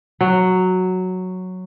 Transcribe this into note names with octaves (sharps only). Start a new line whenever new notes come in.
F#3